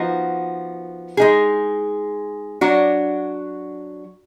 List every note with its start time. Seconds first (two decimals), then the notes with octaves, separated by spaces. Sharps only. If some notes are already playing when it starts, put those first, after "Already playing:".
Already playing: F3 B3 D#4 F#4
1.17 G#3 D#4 G#4
2.61 F#3 D4 F#4